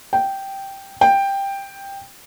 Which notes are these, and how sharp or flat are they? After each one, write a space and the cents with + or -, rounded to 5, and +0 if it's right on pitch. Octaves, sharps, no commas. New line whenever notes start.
G5 -5
G5 +10